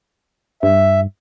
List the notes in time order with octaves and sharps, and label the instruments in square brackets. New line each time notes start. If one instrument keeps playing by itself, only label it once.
[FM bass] G2 [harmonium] E5